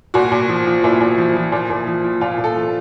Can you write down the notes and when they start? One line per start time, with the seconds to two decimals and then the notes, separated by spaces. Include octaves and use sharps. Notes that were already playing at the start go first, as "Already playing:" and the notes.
0.14 A#2 F#4
0.32 A#2
0.49 F3
0.66 F3
0.84 A#2 E4
1.01 A#2
1.18 F3
1.36 F3
1.52 A#2
1.70 A#2
1.87 F3
2.04 F3
2.21 A#2 F4
2.38 A#2
2.44 A4
2.56 F3